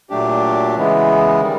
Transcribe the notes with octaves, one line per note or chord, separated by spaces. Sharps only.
A#2 F#3 A3 D4 G4
C#3 E3 G#3 B3 E4
D#3 G3